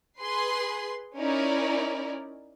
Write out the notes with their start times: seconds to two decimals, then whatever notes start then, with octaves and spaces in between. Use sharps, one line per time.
0.20 G#4 B4 C6
1.18 C#4 D#4 E4 A#4 D5